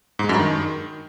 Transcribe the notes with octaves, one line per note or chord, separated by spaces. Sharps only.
G#2
G#3
F#2
G2
D#3